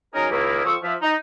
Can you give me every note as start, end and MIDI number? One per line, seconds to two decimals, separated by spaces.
0.14 0.27 54
0.14 0.27 61
0.14 0.27 63
0.14 0.27 68
0.14 0.27 70
0.30 0.62 37
0.30 0.62 51
0.30 0.62 58
0.30 0.62 64
0.65 0.76 41
0.65 0.76 53
0.65 0.76 60
0.65 0.76 85
0.65 0.76 87
0.65 0.76 88
0.83 0.95 53
0.83 0.95 76
1.02 1.14 63